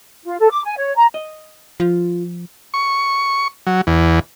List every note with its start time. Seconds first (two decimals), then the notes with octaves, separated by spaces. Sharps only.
0.25 F4
0.40 A4
0.51 D6
0.64 G#5
0.77 C#5
0.96 A#5
1.14 D#5
1.80 F3 F4
2.74 C#6
3.67 F#3
3.87 E2